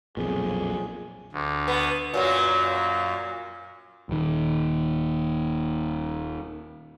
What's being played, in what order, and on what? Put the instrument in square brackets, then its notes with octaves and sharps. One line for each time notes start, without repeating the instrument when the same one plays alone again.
[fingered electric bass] B1 F2 A#2 [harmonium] G#4
[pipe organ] D2
[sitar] B3
[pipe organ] F#2 [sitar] A#2 F#3 A#3
[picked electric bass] D#1 D#3